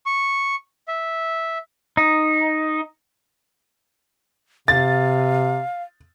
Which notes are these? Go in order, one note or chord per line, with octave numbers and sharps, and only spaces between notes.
C#6
E5
D#4
C3 F5 A6